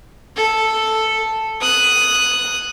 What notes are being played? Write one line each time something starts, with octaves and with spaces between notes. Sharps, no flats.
A4
D#6 F#6